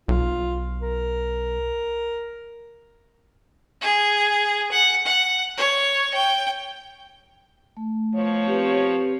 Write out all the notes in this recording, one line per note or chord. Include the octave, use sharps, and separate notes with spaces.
B1 F4
A#4
G#4
F#5
F#5
C#5
G5
A3
B2 F3 C#5
C4 G4 B4